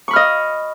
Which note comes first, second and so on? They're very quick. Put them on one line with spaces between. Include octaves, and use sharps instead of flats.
C#6 B5 F6 D#5